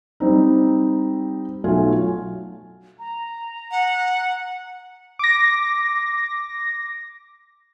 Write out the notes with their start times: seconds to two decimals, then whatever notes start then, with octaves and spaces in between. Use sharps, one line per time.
0.20 G3 C4 D#4
1.64 B1 F#3 A3 F4 F#4 G#5
2.99 A#5
3.71 F#5
5.19 D6 A#6